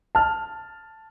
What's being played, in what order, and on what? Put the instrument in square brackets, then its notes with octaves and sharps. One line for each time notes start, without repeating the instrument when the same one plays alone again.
[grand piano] A5 F6